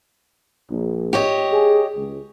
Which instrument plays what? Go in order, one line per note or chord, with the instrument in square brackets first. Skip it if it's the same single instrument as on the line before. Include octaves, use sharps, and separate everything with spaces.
[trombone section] A#1
[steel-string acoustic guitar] G4 C#5 D#5
[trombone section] G#4
C#2